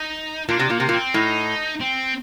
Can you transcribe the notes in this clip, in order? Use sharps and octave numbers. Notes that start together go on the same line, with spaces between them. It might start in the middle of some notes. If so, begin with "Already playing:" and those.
Already playing: D#4
A#2 D4
C3
A#2 A#3
C3
A#2
C4
A2 D#4
C4